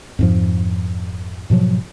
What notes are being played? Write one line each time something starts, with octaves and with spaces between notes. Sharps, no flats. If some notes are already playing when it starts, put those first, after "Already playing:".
F2 G#2 F3
G#2 B2 F3 F#3